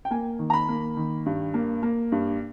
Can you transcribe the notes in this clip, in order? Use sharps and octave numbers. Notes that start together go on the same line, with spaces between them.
G5
A#3 G#5
D#3
A#5
B5
A#3
D#3
G2
A#3
A#3
G2